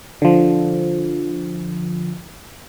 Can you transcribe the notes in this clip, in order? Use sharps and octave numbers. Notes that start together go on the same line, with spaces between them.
D3 F3